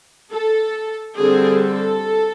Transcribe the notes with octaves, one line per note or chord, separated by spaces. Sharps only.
A4
D3 G3 C4 G#4
A4